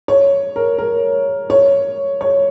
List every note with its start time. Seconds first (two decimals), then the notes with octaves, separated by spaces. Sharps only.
0.08 C#5
0.56 A#4
0.78 A#4
1.50 C#5
2.21 C#5